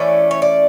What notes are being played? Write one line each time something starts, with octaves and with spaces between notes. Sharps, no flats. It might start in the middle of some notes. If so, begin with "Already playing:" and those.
Already playing: E3 A3 C#4 D5
C#5
D5